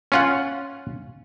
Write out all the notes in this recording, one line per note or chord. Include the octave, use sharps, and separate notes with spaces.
C#4 F4 F#5